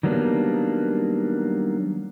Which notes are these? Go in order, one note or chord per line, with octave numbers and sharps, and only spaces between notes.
D#3 F#3 G3 A#3 B3 D4